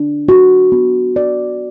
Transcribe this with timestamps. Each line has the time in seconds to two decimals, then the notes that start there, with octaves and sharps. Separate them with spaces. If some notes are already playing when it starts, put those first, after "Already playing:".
Already playing: D4
0.29 F#4
0.72 B3
1.16 D5